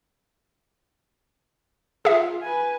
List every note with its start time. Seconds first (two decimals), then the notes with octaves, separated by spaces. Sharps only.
2.05 F4 G#4 E5
2.42 B4 G#5